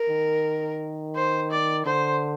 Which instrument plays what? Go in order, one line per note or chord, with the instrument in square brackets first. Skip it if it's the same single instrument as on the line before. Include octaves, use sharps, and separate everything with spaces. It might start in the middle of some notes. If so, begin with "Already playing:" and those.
Already playing: [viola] A#4
[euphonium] D#3
[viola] C5
D5
[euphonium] D3 [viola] C5